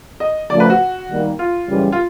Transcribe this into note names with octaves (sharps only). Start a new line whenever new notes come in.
D#5
C#3 F3 A3 D5
B4
F#4
D#3 G3 A#3
F4
F#2 C#3 E3 G3
F4